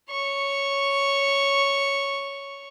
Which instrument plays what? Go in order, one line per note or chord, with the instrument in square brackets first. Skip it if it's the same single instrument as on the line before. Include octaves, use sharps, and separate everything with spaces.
[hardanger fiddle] C#5 C#6